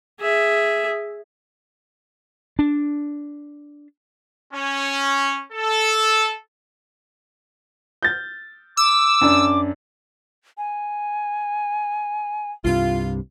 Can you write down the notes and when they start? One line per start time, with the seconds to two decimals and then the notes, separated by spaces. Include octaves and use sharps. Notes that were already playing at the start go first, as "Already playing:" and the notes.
0.21 G#4 E5
2.59 D4
4.53 C#4
5.53 A4
8.03 G6 A6
8.77 D6 E6
9.21 F#2 D4
10.58 G#5
12.65 C2 G2 C3 F4